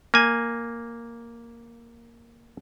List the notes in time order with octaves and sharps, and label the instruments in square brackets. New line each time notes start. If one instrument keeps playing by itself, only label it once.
[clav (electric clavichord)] A#3 G#5